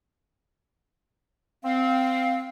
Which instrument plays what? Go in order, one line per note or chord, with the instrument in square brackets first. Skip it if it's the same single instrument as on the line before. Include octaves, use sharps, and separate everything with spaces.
[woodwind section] C4 [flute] F5